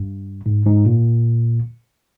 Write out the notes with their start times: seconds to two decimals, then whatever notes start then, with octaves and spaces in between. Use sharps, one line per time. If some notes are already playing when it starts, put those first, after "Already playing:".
Already playing: G2
0.46 G#2
0.66 G#2
0.86 A#2